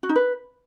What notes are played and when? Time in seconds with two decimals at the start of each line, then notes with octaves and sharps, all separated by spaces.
0.03 F#4
0.09 D#4
0.16 B4